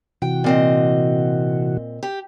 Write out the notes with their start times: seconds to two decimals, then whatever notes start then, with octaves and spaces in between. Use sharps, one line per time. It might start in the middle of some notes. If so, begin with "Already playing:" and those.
0.22 C3 E3 F#4 G5
0.44 A#2 C4 D#5
2.03 G4